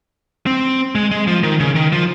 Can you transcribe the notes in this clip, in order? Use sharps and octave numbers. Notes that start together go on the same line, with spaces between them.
C4
G#3
G#3
F3
D#3
C#3
D#3
F3